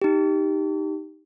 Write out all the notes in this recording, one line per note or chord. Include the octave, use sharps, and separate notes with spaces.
D#4 G4